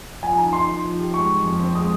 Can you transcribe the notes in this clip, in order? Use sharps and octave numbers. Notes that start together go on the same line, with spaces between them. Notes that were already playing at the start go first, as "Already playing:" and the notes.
F3 G#5
D#4 A#5
D#4 C6
D#4
F3
G4
G#3 C#6
F3
F2
C4
G#3 D#6